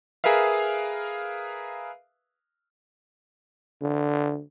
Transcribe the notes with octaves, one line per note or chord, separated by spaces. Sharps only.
G#4 A#4 B4 E5 F5
D3